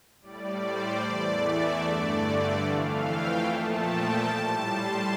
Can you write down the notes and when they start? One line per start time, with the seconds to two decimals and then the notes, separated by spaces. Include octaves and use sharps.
0.22 A2 G3 D5
0.62 C5
1.02 E2 E3 A3 D5
1.42 E5
1.83 G2 D3 A3 D5
2.63 F2 E3 A3 F5
3.04 G5
3.44 A#2 F3 A3 A5
3.84 G5
4.24 A2 G3 A5
4.65 C6